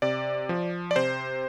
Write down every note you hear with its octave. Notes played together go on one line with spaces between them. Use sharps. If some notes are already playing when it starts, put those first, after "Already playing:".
C3 D5
F3
D5
C3 C5